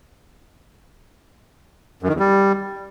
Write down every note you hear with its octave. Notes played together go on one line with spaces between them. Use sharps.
F#2
D#3
E2
G3